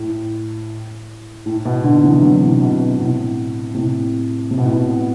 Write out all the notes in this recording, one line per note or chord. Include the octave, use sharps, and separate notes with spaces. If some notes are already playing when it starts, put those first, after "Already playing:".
Already playing: A2
A2
B2
B2 D3
C3 E3
D3 F#3
C3 E3
B2
B2
A2 C3
A2 C3
C3
B2
A2
B2